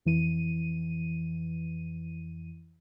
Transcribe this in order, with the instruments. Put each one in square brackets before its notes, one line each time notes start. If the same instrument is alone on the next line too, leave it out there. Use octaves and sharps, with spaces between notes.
[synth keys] F2 E3 D#7